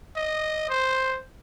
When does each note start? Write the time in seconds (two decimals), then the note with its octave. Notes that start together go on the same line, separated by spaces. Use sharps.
0.16 D#5
0.69 C5